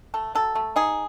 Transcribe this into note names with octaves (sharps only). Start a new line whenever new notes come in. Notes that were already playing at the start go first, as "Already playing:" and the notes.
A3 A4
F#3 A4
A3
D#4 G#4